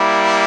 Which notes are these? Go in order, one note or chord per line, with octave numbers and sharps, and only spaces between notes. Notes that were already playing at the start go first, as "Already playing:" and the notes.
Already playing: G3 A#3 E4